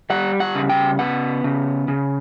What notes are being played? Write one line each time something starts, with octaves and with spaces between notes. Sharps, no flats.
G3 F#5
F#5
C#3
G5
B3 F#5
C#3
C#3